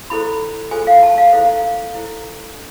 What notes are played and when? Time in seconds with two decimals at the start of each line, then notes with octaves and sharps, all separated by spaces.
0.10 E4 A4 C5 B5
0.71 F4 A4 C5 G#5
0.87 F5
1.03 A5
1.18 F5
1.32 E4 A4 C5 F5
1.95 E4 A4 C5
2.55 D4